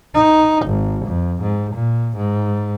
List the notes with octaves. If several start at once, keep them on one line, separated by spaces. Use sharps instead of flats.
D#4
G#1
F2
G#2
A#2
G#2